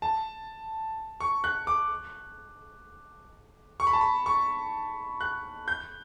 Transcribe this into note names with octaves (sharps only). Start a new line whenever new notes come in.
A5
C#6
F#6
D6
C#6
B5
A5
B5
C#6
F#6
G6